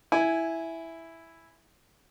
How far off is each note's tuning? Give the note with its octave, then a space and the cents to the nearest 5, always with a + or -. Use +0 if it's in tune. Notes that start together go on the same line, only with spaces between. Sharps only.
E4 +0 G#5 +0